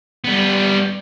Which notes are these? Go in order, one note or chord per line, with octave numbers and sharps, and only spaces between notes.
G3 B3